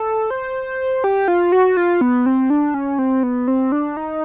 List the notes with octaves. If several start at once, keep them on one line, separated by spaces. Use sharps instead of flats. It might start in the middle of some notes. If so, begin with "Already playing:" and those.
Already playing: A4
C5
G4
F4
F#4
F4
B3
C4
D4
C#4
C4
B3
C4
D4
D#4